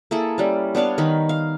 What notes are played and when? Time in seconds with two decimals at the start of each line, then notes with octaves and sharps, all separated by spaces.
0.11 A#3 E4 G#4 A4
0.38 G3 C#4
0.75 B3 D4 C#5 F5
0.98 D#3 D#4 B5
1.29 F5